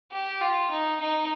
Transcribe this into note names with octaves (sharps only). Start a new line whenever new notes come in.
G4
F4
D#4
D#4